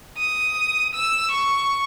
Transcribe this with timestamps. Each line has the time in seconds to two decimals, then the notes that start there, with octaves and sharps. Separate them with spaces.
0.18 D#6
0.94 E6
1.31 C#6